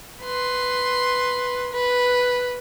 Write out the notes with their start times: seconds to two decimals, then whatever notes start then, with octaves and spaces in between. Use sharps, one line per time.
0.22 B4 C6
1.72 B4